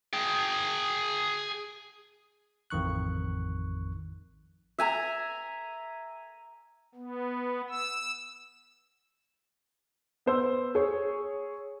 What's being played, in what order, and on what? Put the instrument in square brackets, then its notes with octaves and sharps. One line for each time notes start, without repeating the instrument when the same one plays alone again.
[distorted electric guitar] G#4 G5
[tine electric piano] A1 F2 D#3 C#6 F#6
[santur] E5 G#5 A#5
[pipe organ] B3
E6
[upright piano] B3 C5 E6
G#4 C#5